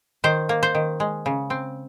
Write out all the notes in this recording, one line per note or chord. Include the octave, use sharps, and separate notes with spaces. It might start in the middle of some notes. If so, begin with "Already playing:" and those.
D#3 C5
A#3
C5
D#3
G#3
C#3
C4